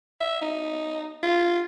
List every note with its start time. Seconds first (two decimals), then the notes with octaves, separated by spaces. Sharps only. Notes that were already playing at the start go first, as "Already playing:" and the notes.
0.21 E5
0.41 D#4
1.23 F4